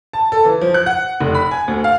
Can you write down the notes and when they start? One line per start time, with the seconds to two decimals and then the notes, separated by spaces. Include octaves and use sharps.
0.13 A5
0.32 A4
0.45 E3
0.61 F3
0.74 F#6
0.86 F#5
1.21 F1
1.35 B5
1.51 G#5
1.68 D2
1.84 F5